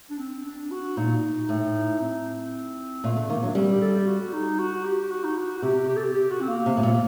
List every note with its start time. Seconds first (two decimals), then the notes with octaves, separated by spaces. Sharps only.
0.10 D4
0.19 C4
0.45 D4
0.71 F#4
0.97 A#2 D#4
1.49 A2
2.00 C4
3.04 A#2 A3
3.17 D3
3.30 D#3 A#3
3.43 F#3 D4
3.55 G3 C4
3.72 G4
3.81 A4
3.95 G4
4.07 F#4
4.33 D#4
4.59 F#4
4.75 F#4
4.84 G4
5.10 F#4
5.24 D#4
5.38 F#4
5.58 F#4
5.62 C3 G4
5.88 G4
5.96 A4
6.03 G4
6.14 G4
6.31 F#4
6.41 C4
6.48 A#3
6.66 C3
6.77 A2
6.83 A#2